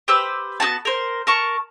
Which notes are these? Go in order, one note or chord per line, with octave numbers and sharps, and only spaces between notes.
G4 B4 C5 E6
B3 D#4 F#4 A5
A#4 C5
A#4 A5 C#6